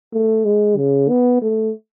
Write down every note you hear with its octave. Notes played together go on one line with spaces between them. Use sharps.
A3
G#3
C#3
B3
A3